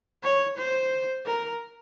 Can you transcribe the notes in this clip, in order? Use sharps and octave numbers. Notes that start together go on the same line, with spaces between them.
C#5
C5
A#4